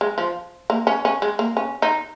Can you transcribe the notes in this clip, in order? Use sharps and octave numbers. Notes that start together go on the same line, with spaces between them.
G#3
F3
A#3
C#4
C#4
G#3
A#3
C#4
D#4